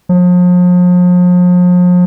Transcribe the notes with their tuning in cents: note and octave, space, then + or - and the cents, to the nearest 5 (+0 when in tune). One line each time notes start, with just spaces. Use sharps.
F3 +40